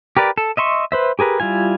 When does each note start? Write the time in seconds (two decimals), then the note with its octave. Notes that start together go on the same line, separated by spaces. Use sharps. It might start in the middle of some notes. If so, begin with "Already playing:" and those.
0.17 G4 A#4 B4 D5
0.38 A4
0.57 D#5 E5 C6 C#6
0.92 B4 C5 E5
1.19 G4 G#4 A#4 B4
1.40 G3 E4 F4 G#5